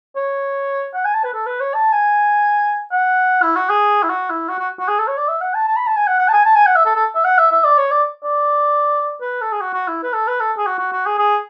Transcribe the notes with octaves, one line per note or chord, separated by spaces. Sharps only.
C#5
F#5
G#5
A5
B4
A4
B4
C#5
A5
G#5
F#5
E4
F#4
G#4
E4
F#4
E4
F#4
F#4
F#4
G#4
A4
C#5
D5
E5
F#5
A5
A5
B5
A5
G#5
F#5
F#5
A5
G#5
A5
G#5
F#5
E5
A4
A4
E5
F#5
E5
E5
D5
C#5
D5
D5
B4
A4
G#4
F#4
F#4
E4
B4
A4
B4
A4
G#4
F#4
F#4
F#4
G#4
G#4